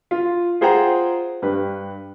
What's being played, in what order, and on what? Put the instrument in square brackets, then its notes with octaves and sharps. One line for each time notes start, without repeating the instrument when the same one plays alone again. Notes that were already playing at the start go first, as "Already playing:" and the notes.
[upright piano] F4
F4 G#4 C5 F#5 G5 A#5
G2 G4 B4